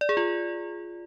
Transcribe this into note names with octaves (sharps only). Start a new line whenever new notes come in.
D5
G#4
F4